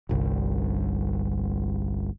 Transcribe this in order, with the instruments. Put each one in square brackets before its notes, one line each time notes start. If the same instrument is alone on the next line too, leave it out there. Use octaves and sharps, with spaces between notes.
[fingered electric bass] G1 C2